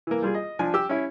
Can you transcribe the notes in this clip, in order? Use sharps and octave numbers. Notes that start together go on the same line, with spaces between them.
E3 A#3
G3 F4 G#4
D#5
F3 D4 G#5
G4 E6
C#4 E4